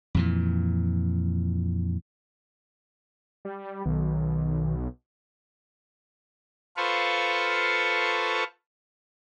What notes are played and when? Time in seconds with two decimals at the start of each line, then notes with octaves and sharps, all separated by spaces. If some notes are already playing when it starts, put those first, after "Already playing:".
0.15 F2 A#2 E3
3.45 G3
3.86 B1 D#3
6.77 F4 A4 B4 C5 F5 C#6